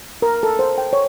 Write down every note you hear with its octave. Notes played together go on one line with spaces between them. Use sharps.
A#4
A4
C5
G5
C#5